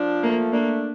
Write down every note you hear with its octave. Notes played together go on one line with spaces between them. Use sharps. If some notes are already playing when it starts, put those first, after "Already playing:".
Already playing: F3 D4
A3 A#3
A#3 D4